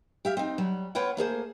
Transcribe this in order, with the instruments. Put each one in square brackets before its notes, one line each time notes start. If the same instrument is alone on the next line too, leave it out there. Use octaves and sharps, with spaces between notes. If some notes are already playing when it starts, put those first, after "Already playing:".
[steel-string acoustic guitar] G4 E5 F5
C4 D#4
F#3 G3
B3 F4 C#5 F#5 G5
A3 A#3 G#4 C5